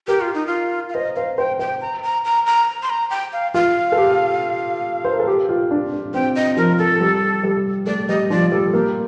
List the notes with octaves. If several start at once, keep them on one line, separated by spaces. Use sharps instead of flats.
G4 A#4
F4
D#4
F4
F5
C5 D#5
C5 F5
C5 G5
C5 G5
A#5
A#5
A#5
A#5
C6
A#5
G5
F5
F4 F5
A4
G4
C5
A#4
A4
G4
F4
D4
D4
C4 G5
D#5
F3 A#4
A4
G3
G3
A3 D5
G3 D#5
F3 D5
G3 A4
A#3 G4